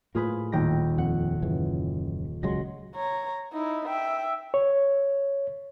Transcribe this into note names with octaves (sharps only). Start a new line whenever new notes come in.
A2 A#3 F4 G#4 B4
D#1 G5 A#6
F2 F#5
F#2 C#3 E3
C#2 F#3 G#3 C6 A#6
C#5 A#5
D#4 E4
E5 G5
C#5